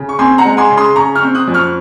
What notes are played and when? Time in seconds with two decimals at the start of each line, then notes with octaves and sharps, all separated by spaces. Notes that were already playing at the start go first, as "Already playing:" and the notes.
Already playing: C#3
0.09 C#6
0.19 C4 G#5 C6
0.38 F#5 A#5
0.45 G#3
0.57 G#5 C6
0.70 C#3
0.77 C6 D#6
0.96 C#3 A#5 C#6
1.15 C#6 F6
1.22 C4
1.35 D#6 F#6
1.48 F2
1.54 C#6 F6